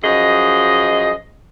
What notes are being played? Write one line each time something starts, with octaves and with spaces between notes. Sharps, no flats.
F#2 F3 G#4 D#5